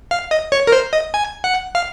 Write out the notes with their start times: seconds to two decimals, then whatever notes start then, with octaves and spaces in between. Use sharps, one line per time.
0.11 F5
0.31 D#5
0.52 C#5
0.67 A#4
0.72 C5
0.93 D#5
1.14 G#5
1.44 F#5
1.75 F5